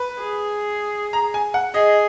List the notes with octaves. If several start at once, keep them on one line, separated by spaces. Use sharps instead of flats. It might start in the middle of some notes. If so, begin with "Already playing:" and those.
Already playing: B4
G#4
A#5
G#5
F#5
G#4 D#5